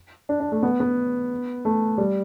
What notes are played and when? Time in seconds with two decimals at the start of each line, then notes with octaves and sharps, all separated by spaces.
0.29 D4
0.40 D4
0.52 A3
0.63 B3
0.80 B3
1.65 A3
1.98 G3